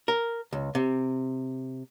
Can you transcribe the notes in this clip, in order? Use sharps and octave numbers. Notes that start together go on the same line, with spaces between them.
A#4
C#2
C3